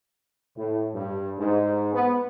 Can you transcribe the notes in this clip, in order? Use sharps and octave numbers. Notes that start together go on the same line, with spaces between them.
A2
G2
G#2
B3